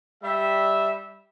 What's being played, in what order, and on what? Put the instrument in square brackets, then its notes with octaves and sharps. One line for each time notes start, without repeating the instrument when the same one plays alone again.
[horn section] G3 E5